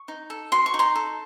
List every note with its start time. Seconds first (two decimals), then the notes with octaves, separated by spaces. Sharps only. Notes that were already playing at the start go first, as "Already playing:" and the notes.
Already playing: C#6
0.08 D#4
0.30 A4
0.52 F#4 C6
0.66 C#6
0.74 D#4
0.79 A#5 C6
0.95 A4